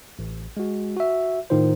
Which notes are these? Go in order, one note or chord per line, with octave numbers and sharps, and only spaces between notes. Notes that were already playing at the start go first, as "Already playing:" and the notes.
A1
G#3 F#4
F#4 E5
A2 D#3 D#4 F4 C5